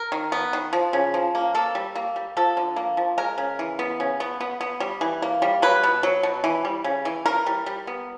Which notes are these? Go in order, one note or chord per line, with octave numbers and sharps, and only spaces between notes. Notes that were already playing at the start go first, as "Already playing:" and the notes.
Already playing: A#4
D#3
B3
D#3
F3
C#3
F3
A#3
A#3 A4
G3
A#3
G3
F3 A4
D3
A#3
F3
G#3 A#4
C#3
E3
B3
C#3
B3
B3
B3
G3
E3
A#3
G3
F#3 B4
B2
F#3
B2
E3
G3
C#3
E3
E3 A#4
G3
G3
B3